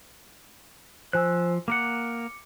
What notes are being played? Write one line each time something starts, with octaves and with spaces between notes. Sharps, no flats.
F3 C5 G#5 E6 F#6
A#3 A#4 F#5 D6 C#7